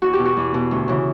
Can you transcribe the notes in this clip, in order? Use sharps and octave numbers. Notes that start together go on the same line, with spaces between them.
E2 F#4
G4
B2
F#4
E2
B2
D2
C#3 E3